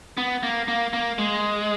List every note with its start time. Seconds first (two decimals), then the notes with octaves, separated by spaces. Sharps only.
0.17 B3
0.43 A#3
0.68 A#3
0.93 A#3
1.18 G#3